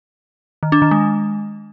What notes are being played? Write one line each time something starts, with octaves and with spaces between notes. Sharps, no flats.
D#3
D4
D#3
G#3